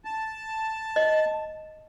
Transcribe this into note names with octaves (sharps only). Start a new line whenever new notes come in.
A5
D#5